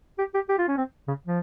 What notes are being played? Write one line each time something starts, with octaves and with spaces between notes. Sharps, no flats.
G4
G4
G4
F4
C#4
C4
C#3
F3